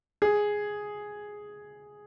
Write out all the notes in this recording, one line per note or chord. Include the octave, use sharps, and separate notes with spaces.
G#4